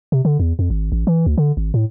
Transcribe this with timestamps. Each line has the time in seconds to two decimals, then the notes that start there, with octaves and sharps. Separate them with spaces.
0.12 C3
0.25 D3
0.40 E2
0.59 F2
0.70 G#1
0.92 A1
1.07 E3
1.26 D2
1.38 D3
1.57 G#1
1.74 A2